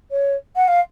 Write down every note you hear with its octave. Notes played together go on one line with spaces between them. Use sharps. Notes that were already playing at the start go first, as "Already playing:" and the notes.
C#5
F#5
F5